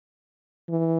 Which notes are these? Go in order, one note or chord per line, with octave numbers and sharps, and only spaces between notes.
E3